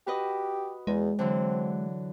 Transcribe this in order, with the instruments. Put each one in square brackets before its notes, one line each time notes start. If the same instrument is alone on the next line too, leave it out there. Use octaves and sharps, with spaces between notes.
[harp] F#4 B4 D#5 [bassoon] G4
[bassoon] E2 [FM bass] G#3
[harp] D3 E3 F#3 [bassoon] C4